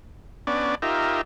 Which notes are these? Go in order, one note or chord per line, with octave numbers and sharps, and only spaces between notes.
B3 C#4 D4 D5
D#4 F4 G4 A#4 E5